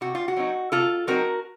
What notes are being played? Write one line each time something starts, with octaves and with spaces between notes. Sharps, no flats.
C3 F#4
F4
F#4
F#3 C4 D#4
C3 F4 A4
F#3 C4 D#4 F#4 A#4